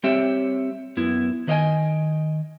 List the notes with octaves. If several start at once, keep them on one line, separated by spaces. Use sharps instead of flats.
G3 C4 G4 C#5 E5
F#2 B3 E4
D#3 B4 D#5 F5 G5 G#5